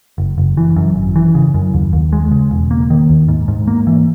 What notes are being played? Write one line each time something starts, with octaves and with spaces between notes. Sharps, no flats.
F#1
F#1
E3
F#2
G#1
E3
C#3
F#2
D#2
D#2
G#3
C#3
E1
A#3
D#3
D#2
G#2
G#2
A#3
E3